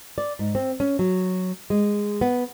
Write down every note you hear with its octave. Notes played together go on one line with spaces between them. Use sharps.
D5
G#2
C4
C#4
F#3
G#3
B3